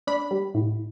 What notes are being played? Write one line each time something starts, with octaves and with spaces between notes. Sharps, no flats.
D4 B5
G3
A2